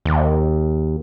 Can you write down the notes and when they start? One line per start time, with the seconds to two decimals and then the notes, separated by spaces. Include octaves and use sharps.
0.05 D#2